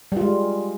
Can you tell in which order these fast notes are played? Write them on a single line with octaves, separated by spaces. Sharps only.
G3 F4 G#3